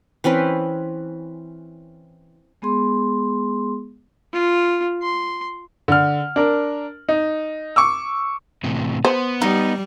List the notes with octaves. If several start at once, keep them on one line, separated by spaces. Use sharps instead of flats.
E3 C4 C#4 B4
G#3 B3 G#4 C6
F4
C6
D3 F6
D4 A#4
D#4
C#6 D6 E6
A2 C3 E3
B3 C5
G3 D#4